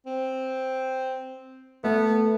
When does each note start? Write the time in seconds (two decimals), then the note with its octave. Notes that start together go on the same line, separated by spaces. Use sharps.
0.06 C4
1.84 A3 B3